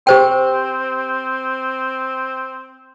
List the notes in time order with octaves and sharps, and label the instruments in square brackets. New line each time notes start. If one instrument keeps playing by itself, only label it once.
[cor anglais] C4 [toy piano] G4 C5 G5